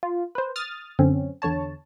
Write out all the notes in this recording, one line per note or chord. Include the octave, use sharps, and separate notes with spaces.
F4
B4 C5
D#6 F6 A6
F#2 D3 C4 C#4
E2 D3 C#5 A5